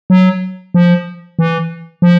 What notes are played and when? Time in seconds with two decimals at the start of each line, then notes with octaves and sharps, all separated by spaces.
0.10 F#3
0.74 F3
1.39 E3
2.02 F3